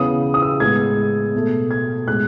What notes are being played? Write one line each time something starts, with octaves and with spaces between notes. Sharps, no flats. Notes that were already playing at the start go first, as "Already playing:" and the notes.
Already playing: C#3 E3 B3 D#6
D#6
E6
A2 G#3 B3 G#6
B2 A3
G#6
A2 G#3 B3 F#6